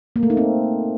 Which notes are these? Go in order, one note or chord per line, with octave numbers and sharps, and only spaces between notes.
A#3
A3
D#4
C4